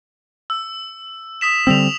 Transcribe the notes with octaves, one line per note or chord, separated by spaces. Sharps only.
E6
D#6 B6 E7
D3 G3 C4 E6 F7